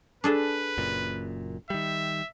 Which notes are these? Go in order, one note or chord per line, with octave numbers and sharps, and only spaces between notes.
D4 G#4 A4 B4
F#1 F#2 A#2
D#3 G3 E5